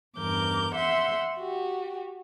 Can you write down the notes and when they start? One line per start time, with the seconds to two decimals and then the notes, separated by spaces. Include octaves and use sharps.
0.18 E2 G2 A#4 D6 G6
0.75 E5 F#5 C6 G6
1.38 F#4 G4